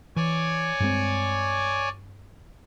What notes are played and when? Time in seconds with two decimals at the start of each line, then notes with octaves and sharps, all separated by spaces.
0.16 E3 C#5 D5 G#5
0.80 G2 G#3 C4